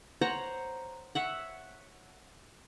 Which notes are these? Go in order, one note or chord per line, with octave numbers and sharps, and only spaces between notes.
C5 C#5 F#5 A#5
C#5 E5 F#5